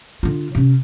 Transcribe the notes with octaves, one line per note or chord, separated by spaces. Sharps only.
D3 F4
C3 C#4